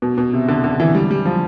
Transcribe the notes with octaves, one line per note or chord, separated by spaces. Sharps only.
B2
B2
C3
D3
D3
E3
G3
G3
F3